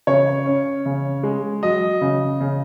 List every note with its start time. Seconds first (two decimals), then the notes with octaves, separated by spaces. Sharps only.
0.07 C#3 C#5
0.46 C#4
0.86 C#3
1.23 G#3
1.63 F#3 D#5
2.01 C#3
2.41 C#3